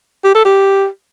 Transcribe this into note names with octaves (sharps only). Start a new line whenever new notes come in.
G4
A4
G4